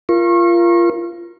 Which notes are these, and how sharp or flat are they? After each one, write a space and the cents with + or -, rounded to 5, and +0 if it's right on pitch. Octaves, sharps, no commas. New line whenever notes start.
F4 -25 A#4 +15 C#6 -35